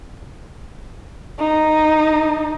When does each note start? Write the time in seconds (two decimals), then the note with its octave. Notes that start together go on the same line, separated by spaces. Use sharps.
1.39 D#4